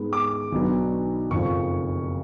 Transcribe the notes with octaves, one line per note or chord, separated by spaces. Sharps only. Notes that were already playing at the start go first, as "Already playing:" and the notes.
Already playing: G#2 G#3 B3
D6
B1 B2 F#3 B3 D4
F#1 F2 F3 C#6